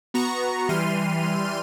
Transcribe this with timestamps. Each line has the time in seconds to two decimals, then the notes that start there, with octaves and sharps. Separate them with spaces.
0.14 B3 F#4 A#5 C#6
0.69 E3 G3 C6 F6 D#7